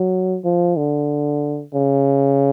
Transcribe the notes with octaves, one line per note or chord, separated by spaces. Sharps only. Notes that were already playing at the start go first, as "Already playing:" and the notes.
Already playing: F#3
F3
D3
C#3